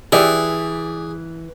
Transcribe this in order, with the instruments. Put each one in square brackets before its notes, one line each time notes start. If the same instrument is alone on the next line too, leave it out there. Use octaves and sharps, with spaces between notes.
[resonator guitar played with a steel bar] E3 [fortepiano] G4 D5 E6 [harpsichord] G#4